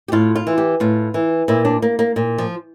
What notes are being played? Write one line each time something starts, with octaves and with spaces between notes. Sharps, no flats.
G4
A2 F4
F4
E3
G4
A2 F4
E3
A#2 E4
D4
A#3
A#3
A#2
F3